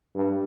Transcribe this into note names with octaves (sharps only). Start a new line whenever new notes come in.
G2